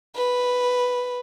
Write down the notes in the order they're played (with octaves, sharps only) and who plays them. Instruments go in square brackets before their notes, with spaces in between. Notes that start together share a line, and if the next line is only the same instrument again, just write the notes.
[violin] B4